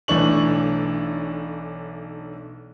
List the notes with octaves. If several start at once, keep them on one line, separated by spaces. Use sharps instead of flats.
B1 E3 A3 D4 C#6 F#7